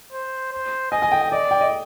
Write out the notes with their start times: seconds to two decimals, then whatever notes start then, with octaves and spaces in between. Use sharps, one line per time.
0.12 C5
0.53 C5
0.91 D#5 G#5
1.02 G#5
1.12 G5
1.22 G5
1.32 D5 D#5
1.51 G5
1.61 D#5